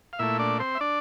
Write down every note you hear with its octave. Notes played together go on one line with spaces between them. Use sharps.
F5
A#2 A3 E4 E5
D4 D5
C4 C5
E5
D4 D5